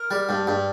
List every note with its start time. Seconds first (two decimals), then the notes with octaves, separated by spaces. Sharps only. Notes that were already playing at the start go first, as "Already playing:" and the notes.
Already playing: A#4
0.11 G3
0.29 G2
0.47 G2